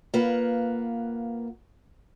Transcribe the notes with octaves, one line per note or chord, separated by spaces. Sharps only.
A#3 F4 B4 F#5